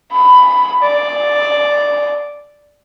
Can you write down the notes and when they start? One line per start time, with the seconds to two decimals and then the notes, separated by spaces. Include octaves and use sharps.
0.12 B5
0.83 D5